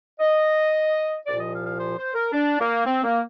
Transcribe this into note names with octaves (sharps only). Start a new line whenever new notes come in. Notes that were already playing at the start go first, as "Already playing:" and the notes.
D#5
C2 A#2 F3 D5
D#5
F5
F5
C5
C5
A#4
D4
A#3
C4
A#3